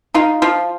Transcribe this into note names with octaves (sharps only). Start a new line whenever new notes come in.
D#4 F4
F3 F4